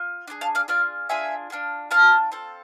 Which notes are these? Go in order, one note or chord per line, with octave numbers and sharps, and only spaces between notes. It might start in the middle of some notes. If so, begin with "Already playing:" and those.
Already playing: F4
D4 F4 G#4
F5 A5
D5 F5
D4 F4 G#4 D5 F5
D4 F4 G#4 E5 G#5
D4 F4 G#4
D4 F4 G#4 F5 A5
C4 F4 A4